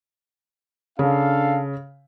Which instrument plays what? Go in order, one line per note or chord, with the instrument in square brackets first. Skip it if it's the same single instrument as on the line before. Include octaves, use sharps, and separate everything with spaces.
[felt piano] C#3 [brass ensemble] D4 A4 F5